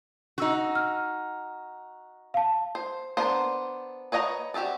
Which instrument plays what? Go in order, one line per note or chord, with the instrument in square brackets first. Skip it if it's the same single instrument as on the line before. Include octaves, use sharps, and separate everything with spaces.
[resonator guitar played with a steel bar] D#4 F#4 [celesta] F#5 E6
[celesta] F6
F5 A5
[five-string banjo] C5
B3 D4 A#4 C5
B4 C#5 D#5 F#5 A#5
C4 F#4 G4 A4 D5